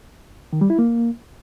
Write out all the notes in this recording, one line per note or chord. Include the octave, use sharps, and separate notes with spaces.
D#3
G3
E4
A#3